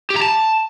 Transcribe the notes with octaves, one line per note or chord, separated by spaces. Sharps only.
G4
A#5
A5